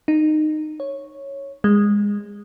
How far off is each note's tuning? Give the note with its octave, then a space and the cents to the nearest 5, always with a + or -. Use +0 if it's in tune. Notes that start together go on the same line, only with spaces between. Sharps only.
D#4 -20
C#5 -5
G#3 -20